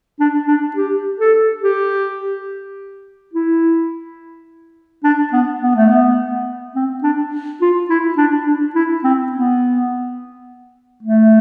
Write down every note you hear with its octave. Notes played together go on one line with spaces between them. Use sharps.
D4
D4
G4
A4
G4
E4
D4
B3
B3
A3
B3
C4
D4
F4
E4
D4
D4
E4
C4
B3
A3